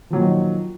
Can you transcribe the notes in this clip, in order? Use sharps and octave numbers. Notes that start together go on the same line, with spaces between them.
A#2 D#3 F3 F#3